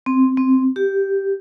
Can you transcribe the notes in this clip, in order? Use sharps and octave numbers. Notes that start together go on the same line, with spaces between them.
C4
C4
G4